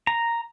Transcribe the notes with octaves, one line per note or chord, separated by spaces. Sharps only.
A#5